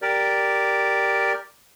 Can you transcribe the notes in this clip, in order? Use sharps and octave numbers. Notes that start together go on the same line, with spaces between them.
G4 A#4 D5